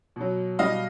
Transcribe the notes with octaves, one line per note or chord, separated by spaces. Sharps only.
B2 F#3
B2 G3 D#5 F5